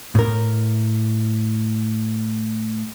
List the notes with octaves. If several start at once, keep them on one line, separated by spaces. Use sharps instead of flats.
A2 A#4